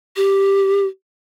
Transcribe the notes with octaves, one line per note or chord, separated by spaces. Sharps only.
G4